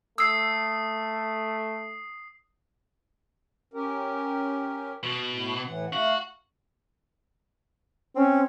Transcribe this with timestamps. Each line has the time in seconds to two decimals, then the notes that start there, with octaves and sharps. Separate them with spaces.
0.18 A3 D#6 E6 C7
3.74 C#4 G4 A#4
5.03 B2
5.29 A2
5.65 A2 E3 F#5
5.93 A3 F#4 F5
8.16 C4 C#4